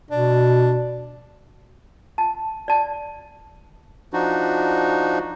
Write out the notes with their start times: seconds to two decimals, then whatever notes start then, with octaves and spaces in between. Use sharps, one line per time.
0.11 B2 D4
2.18 A5
2.68 D5 A5
4.13 F3 D4 D#4 F#4